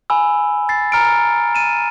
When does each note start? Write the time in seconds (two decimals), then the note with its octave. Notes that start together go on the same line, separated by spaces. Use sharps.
0.10 G#5 B5 E6
0.69 A6 C7
0.92 A#5 F6 C#7 D7
1.55 A6 D#7 E7